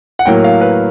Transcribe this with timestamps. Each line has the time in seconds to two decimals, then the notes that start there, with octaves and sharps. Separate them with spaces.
0.19 F#5
0.26 A2 F#3 A#3 G5
0.44 F5
0.61 B4